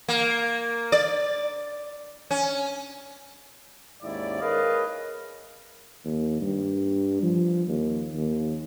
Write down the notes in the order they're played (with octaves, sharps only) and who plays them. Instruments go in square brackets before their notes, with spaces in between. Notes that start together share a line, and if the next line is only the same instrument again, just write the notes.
[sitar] A#3
D5
C#4
[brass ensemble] D#2 G#2 C#4 E4 D5
G#4 A#4 B4 C#5 D#5 F5
[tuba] D#2
G2
F3
D#2
D#2